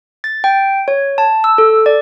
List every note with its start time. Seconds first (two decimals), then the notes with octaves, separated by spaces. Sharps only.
0.24 A6
0.44 G5
0.88 C#5
1.18 A5
1.44 E6
1.58 A4
1.86 D5